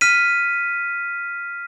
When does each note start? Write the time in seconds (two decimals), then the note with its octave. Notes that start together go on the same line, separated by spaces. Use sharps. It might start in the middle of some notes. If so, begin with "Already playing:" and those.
0.01 F6 B6 D#7